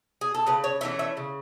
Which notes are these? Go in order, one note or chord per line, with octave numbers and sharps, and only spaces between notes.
G#4
A4
C#3 B4
C#5
E3 A3 C#4 E5
E5
C#3